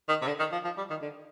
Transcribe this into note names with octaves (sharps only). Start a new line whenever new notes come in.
D#3
C3
D3
D#3
F3
F3
G3
D#3
D3